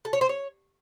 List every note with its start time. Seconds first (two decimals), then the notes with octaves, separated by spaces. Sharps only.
0.05 A4
0.13 C#5
0.21 C5
0.29 C#5